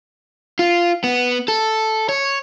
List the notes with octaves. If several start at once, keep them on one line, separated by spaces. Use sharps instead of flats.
F4
B3
A4
C#5